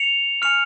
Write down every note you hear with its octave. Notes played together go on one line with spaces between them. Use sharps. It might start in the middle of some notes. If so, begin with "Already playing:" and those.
Already playing: C#7 F7
G#5 C#6 F6 C#7 F7